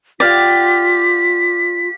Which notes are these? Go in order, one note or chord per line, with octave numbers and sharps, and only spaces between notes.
F4 G4 D5 F5 F#5 B6